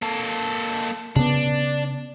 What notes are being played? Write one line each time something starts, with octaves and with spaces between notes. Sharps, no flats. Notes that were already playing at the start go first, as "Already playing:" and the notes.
A#3 A4
C#3 B3 D4